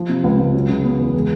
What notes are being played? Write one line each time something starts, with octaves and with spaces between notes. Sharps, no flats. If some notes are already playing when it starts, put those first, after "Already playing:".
Already playing: F3
C3
C#2
C#2
F#3
C#3
B3
E2
G#3